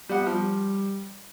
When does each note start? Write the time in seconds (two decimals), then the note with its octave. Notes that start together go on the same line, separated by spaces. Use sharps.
0.09 G3 B3 F#5
0.27 F3 G3